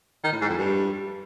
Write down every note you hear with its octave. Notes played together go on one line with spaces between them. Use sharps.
D#3
A2
G#2
F2
G2